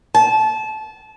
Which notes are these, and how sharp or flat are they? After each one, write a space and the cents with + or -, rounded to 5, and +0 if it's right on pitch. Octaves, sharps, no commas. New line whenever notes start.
A5 -25